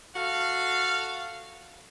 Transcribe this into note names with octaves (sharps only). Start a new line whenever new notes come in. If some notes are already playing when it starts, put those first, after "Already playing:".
F#4 A4 F5